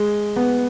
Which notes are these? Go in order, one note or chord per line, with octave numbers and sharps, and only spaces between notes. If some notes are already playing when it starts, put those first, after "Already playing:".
Already playing: G#3
B3